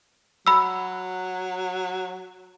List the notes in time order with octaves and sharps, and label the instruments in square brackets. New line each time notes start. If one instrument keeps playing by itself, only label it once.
[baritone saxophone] F#3 [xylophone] B5 E6